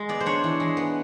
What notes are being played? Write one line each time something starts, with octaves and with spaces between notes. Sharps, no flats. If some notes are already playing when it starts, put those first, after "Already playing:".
Already playing: G#3
B3 D5
C5
D4 C#5
E3
G#3
B3